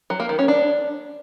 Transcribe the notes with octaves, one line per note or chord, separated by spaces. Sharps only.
F#3
A#3
D#3
C#4
D4